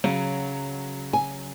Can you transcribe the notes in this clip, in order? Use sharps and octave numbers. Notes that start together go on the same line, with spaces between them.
C#3 F#3
G#5